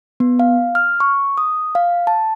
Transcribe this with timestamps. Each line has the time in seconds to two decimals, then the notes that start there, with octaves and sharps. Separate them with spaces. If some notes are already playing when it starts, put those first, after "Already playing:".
0.20 B3
0.39 F5
0.75 F6
1.00 C#6
1.38 D#6
1.75 F5
2.07 A5